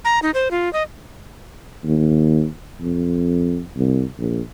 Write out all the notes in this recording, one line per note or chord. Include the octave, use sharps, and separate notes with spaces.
A#5
D#4
C5
F4
D#5
D#2
F2
C2
A#1